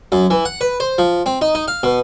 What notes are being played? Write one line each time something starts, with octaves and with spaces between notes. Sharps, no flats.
F#2
E3
F#5
B4
C5
F3
C4
D#4
D#4
F5
B2